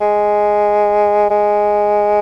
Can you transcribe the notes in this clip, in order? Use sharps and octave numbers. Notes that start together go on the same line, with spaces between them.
G#3
G#3